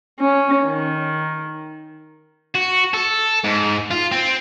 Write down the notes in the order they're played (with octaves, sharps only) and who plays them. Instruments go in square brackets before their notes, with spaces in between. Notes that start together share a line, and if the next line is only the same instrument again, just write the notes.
[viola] C#4
D#3
[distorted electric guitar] F#4
A4
G#2
F4
C4